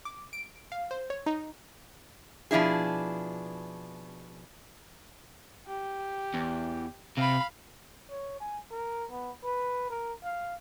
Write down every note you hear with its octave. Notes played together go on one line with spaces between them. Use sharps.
D6
D7
F5
C5
C#5
D#4
B2 F3 D4 E4 G#4
G4
E2
C3 F5 B5
C#5
G#5
A#4
B3
B4
A#4
F5